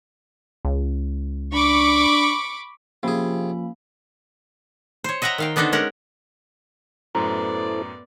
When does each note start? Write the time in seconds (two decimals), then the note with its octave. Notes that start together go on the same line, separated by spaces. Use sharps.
0.65 C#2
1.53 D4 B5 C#6 D6
3.03 C3 F3 A#3 C#4 G#4 B5
5.04 C5 C#5
5.22 D#5 E5 F#5 G5 A#5
5.38 D#3 F5 G5
5.56 D3 B3 D4 D#4 A4 C5
5.73 G#3 C#4 A#4 F#5
7.15 F#2 A2 B3 E4 A4 C5 D5 A#5